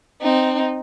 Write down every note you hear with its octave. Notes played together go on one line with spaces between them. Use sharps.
C4 D#4